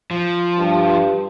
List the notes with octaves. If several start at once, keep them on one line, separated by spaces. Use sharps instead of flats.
F3
G2